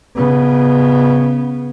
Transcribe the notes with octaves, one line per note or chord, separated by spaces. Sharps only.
C#3 B3